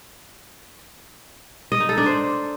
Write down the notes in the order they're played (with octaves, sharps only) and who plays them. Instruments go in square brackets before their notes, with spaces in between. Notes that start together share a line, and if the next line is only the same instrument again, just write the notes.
[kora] D#5
D#4
A4
D4
C5